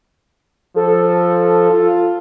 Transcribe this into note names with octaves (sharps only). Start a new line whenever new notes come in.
F3 A4
F4